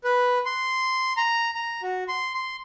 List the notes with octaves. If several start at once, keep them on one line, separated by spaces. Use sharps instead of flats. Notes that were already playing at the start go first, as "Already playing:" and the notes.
B4
C6
A#5
A#5
F#4
C6
C6